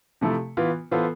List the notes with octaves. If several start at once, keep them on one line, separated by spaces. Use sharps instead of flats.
C3 F3 A3 E4 A4
E3 B3 F4
E3 B3 F4 A4 C5